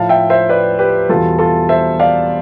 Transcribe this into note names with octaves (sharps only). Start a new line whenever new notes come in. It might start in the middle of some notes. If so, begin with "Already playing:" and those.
Already playing: A2 F3 F5 A5
E5 G5
C5 E5
B4 D5
G4 B4
E2 B2 G3 F4 A4
F4 A4
C5 E5
D5 F5